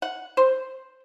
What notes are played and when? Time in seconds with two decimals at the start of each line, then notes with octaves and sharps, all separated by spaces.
0.02 F#5
0.37 C5